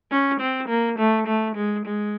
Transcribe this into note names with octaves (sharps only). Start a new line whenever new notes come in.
C#4
C4
A#3
A3
A3
G#3
G#3